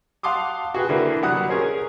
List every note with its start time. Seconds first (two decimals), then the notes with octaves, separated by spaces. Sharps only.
0.23 F5 F#5 A5 C6 D6 D#6
0.74 F#4 G#4 B4 G5
0.89 D3 E3 A#3 D4 E4
1.22 C2 F#3 G3 F#5 D#6 F#6
1.49 C#4 G#4 A#4 C5 C#5